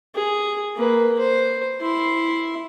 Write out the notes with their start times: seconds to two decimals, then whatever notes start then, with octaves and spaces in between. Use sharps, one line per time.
0.15 G#4
0.76 A#3 B4
1.19 C5
1.81 E4 C6